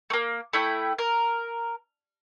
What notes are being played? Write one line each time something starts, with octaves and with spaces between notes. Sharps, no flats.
A3 A#3
A3 E4 G5
A#4